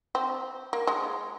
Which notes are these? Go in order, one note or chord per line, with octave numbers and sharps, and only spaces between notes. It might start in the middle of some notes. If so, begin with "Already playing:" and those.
C4
A#3
G#3